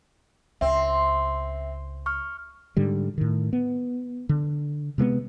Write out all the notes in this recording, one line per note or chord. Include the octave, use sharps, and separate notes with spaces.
C#2 C4 E5
C#6 F6
G#2 D3 G3
A2 D#3
B3
D3
C3 G#3 A#3 B3